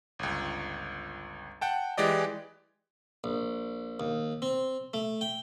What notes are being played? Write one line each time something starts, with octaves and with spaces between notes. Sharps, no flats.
G1 C#2
F#5 G5 A5
E3 G#3 G4 D5 D#5
A#1
D#2
C4
A3
G5